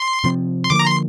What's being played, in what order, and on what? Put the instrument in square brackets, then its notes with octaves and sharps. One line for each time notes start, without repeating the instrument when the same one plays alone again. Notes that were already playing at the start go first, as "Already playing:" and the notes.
Already playing: [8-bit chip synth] C6
[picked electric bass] C3 F3 C4
[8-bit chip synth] C6
[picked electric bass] D3 F3 A#3 [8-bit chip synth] D6
[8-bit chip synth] A#5
C6